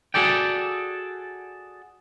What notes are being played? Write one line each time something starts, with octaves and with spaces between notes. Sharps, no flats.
F#4 G#4 A4 D5 G5